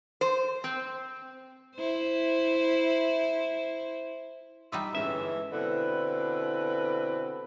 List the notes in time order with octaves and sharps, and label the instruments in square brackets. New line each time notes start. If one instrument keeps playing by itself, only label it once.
[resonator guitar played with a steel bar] C5
C4
[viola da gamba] E4 C5
[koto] G3 D#4 F4 [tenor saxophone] E5 [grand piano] D6 D#6
[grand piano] G1 G#3 C#4 [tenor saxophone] E3 [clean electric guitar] E5
[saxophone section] B2 D3 C4 E4 B4